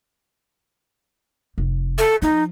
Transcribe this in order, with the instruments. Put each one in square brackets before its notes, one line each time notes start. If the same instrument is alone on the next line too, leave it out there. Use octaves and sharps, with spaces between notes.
[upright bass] F1
[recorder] A4
[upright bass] F3 [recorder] D#4